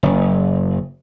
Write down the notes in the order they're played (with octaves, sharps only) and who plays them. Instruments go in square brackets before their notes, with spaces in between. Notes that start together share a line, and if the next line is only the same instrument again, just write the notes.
[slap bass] F#1